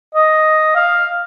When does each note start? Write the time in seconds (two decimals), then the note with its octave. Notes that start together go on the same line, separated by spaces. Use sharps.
0.15 D#5
0.76 F5